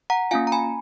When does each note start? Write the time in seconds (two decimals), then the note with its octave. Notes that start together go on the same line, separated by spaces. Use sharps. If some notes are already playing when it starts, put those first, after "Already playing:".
0.10 F#5 A#5
0.31 A#3 C#4 F4 F5 G#5
0.47 A#5
0.52 G#5 B5